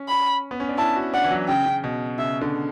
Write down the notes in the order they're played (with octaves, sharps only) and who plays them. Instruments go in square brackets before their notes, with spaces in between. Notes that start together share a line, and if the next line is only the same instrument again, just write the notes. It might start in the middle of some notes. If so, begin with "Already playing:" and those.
Already playing: [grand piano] C#4
[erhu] B5
[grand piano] B3
C#4
D4
[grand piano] E4 [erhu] A5
[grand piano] F#4
[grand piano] D4 [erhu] F#5
[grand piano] E3
F#3
[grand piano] C#3 [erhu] G5
[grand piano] C#3
B2
[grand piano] C#3 [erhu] E5
[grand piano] D3